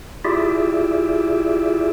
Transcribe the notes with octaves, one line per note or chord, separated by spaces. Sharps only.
E4 F4 G4 G#4 D5 E5